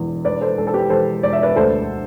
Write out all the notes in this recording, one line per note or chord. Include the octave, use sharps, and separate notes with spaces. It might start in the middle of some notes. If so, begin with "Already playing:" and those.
Already playing: E1 E2
E1 B4 D5
A4 C5
E1 A4
A4
G4 B4
E1 A4 C5
E1 D5
E5
B4 D5
D2 A4 C5